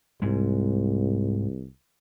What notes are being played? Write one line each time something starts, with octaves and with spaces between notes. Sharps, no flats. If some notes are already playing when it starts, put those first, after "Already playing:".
C2 G#2 G#3